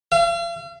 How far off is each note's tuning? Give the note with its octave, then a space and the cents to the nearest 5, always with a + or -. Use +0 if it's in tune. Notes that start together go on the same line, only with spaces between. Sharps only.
F5 -45